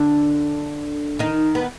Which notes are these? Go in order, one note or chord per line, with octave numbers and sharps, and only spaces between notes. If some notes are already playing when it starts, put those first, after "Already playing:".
Already playing: D3 D4
D#3 D#4
B3